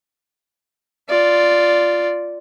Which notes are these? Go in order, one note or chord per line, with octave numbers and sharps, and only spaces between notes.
F4 D5